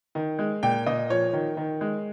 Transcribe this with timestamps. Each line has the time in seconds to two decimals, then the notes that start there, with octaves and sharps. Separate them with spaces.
0.15 D#3
0.39 G#3
0.63 A#2 G5
0.86 A#2 D#5
1.10 F3 C#5
1.33 D#3
1.57 D#3
1.81 G#3